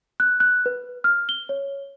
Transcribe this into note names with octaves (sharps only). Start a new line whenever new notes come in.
F#6
F#6
B4
F6
G7
C#5